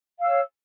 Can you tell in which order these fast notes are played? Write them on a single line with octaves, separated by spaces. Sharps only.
F5 E6 C#5